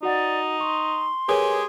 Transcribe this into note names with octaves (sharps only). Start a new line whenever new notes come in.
D#4 F#4 D5 F#5
C6 C#6
G#3 G4 G#4 A#4 B4 C#5